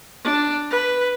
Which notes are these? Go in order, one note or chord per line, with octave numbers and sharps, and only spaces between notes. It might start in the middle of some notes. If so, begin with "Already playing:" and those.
D4
B4